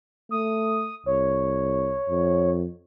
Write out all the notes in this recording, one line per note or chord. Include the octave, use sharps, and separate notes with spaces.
A3 D#6
C2 C#5
F2